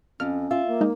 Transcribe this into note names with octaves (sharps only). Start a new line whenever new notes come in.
F2 C#4 F6
F4 E5
A#3
G#3 D#4